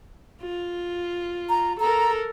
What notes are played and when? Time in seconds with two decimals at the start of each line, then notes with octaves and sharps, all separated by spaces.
0.41 F4
1.49 A#5
1.80 A4 A#4 A#5